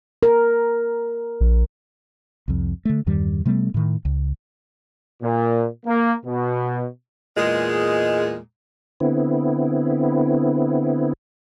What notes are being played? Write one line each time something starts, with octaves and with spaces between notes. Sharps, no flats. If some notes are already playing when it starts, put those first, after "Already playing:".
A#4
A#1
C2 F2
D3 A3
E2 G2 D#3 G3
C3 G3 A3 B3
A2 D#3
C#2
A#2
A#3
B2
E2 A#2 G#3
D3 B3 C4 E4